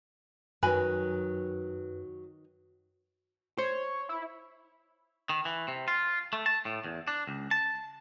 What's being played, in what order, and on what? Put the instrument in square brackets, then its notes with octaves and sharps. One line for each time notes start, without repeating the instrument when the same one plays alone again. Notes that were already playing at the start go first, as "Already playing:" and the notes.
[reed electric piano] F#2 [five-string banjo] D#3 G#5 B5 [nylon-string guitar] F#3 [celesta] B4 F#6
[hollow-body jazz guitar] C5 [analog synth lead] C#5
[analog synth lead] E4
[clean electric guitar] D#3
E3
C3
F4
A3
A5
A2
E2
D4
C#2
A5